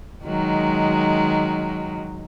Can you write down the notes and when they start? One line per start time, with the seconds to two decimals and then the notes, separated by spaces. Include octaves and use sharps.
0.25 D#3 F#3 G#3